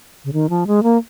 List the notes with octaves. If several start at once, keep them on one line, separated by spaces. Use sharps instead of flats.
C#3
D#3
F3
G#3
A#3